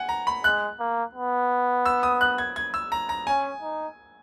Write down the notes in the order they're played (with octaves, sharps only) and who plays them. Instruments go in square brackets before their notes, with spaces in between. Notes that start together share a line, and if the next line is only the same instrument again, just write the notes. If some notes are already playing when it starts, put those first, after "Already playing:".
Already playing: [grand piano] F#5 G#5
A#5
B5
[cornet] G#3 [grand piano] F#6
[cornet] A#3
B3
[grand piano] E6
D#6
F#6
G#6
G#6
E6
A#5
A#5
[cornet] C#4 [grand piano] G#5
[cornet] D#4